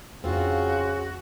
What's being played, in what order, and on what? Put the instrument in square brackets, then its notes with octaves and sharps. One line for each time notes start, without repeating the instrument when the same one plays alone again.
[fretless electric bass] F2 D4 [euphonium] C#3 [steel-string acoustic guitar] C4 F4 [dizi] F#4